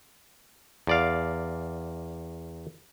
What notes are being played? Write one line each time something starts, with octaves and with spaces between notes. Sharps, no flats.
E2 D5 F5